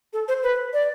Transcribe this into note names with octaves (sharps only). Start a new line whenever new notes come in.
A4
C5
B4
D5